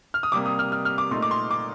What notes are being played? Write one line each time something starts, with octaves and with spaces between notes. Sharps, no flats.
F6
D#6
C3 G3 A#3 D6
D#6
F6
F6
F6
D6
A#2 A3 D#4 C6
D6
C6
D6